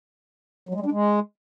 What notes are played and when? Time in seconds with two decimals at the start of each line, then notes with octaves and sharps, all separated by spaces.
0.69 F#3
0.75 G#3
0.80 G3
0.86 D4
0.92 G#3